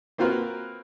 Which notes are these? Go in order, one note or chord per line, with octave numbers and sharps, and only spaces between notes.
A#3 C4 F4 F#4 A#4 B4